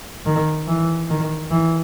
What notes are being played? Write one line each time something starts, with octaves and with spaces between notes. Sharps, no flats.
D#3
E3
D#3
E3